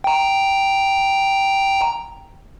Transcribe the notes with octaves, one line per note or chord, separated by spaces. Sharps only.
G5 A#5